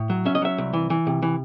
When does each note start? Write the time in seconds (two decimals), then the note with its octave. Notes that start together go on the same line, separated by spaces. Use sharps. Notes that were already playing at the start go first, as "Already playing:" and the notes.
Already playing: A2
0.10 F#3
0.26 C#4 E5
0.35 D#5
0.42 F#3 E5
0.58 C2
0.73 E3
0.90 E3
1.07 C3
1.22 E3